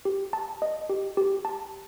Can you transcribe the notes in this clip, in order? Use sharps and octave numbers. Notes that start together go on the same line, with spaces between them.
G4
A5
D#5
G4
G4
A5